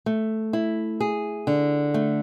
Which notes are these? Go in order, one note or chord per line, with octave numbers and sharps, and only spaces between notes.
A3
E4
G#4
D3
A3